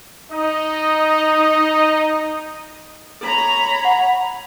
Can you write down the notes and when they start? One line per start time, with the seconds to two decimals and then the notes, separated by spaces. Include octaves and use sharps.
0.32 D#4 D#5
3.21 A4 C#5 A#5 B5
3.85 F#5